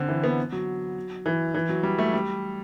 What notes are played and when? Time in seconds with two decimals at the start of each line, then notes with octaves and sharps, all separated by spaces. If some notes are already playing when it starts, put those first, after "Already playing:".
Already playing: D3 C4
0.09 E3
0.24 B3
0.52 F#3
1.26 E3
1.54 E3
1.69 F#3
1.83 G3
1.98 A3
2.13 G3